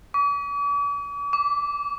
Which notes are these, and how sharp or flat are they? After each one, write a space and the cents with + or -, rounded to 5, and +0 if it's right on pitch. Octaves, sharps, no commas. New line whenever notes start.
D6 -45
D6 -20